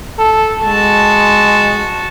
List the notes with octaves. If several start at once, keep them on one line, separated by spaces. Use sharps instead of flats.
A4
G#3 F#4 A5